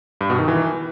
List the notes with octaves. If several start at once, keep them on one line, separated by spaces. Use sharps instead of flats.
G2
B2
D#3
E3